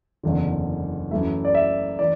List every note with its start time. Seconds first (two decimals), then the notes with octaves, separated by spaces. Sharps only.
0.23 F#1 E2 D3
1.11 F#2 E3 A3 E5
1.45 D5
1.55 E5
1.99 E3 D5